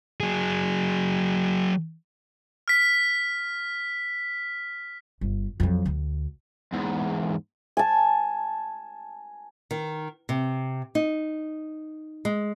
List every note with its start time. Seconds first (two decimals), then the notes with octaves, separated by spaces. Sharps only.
0.20 F#3 G#4
2.68 F6 B6
5.21 G1
5.60 F2 F#3
5.86 D2
6.73 E2 G#2
7.77 G#5 A5
9.71 D#3
10.29 C3
10.95 D#4
12.25 G#3